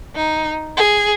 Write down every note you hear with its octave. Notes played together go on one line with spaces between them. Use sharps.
D#4
G#4